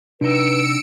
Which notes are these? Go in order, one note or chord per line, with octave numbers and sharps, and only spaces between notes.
C3 D4 D#4 B4 E6 C#7 D7